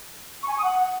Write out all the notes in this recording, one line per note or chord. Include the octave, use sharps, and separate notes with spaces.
C#6
G#5
C#6
D#6
F#5